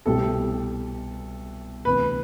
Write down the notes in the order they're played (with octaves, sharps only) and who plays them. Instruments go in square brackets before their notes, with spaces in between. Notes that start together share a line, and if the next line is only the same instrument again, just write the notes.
[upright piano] C2 B2 F#3 C4 G4 [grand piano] A4
[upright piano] D2 C3 E3 B3 [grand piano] B4